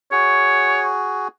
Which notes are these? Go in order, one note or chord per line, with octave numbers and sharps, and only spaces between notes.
F#4 G#4 C#5